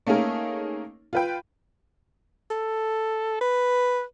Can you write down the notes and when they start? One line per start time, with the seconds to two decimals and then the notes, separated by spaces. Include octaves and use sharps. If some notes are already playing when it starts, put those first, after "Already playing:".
0.07 A3 A#3 C#4 D#4 G#4 A#4
1.13 F4 B4 G5
2.50 A4
3.41 B4